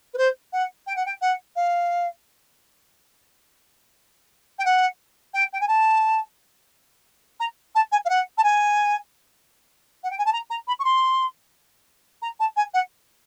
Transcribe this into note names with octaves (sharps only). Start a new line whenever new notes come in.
B4
C5
F#5
G5
F#5
G5
F#5
F5
G5
F#5
G5
G5
G#5
A5
A#5
A5
G#5
F5
F#5
A5
G#5
F#5
G5
G#5
A5
A#5
A#5
B5
C#6
C6
A#5
A5
G#5
F#5